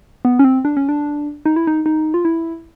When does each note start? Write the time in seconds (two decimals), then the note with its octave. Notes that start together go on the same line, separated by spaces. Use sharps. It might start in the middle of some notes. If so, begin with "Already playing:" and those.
0.25 B3
0.39 C#4
0.44 C4
0.65 D4
0.77 C#4
0.89 D4
1.46 D#4
1.56 E4
1.67 D#4
1.86 D#4
2.14 F4
2.25 E4